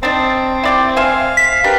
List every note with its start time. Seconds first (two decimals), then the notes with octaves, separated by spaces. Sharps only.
0.03 C4 D4 D#4 A5
0.64 E4 D5 G5
0.96 C5 E5 F5 G#5
1.37 B6
1.64 D4 G4 A#4 B4